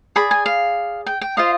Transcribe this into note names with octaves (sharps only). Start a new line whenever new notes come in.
G#4 D5 B5
G#5
F5
G5
G5
F4 C5 D#5 F5